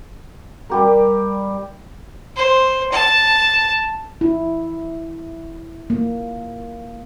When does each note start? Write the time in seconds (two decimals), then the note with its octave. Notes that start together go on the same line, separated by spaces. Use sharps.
0.70 G3 G4 A#4
2.36 C5
2.92 A5
4.21 E4
5.90 A#3